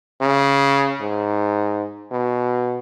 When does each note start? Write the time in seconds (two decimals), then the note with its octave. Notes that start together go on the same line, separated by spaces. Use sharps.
0.21 C#3
1.01 G#2
2.11 B2